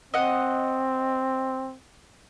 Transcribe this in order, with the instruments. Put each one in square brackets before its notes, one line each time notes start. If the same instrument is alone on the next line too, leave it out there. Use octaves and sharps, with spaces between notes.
[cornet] C4 [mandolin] D#5 F#5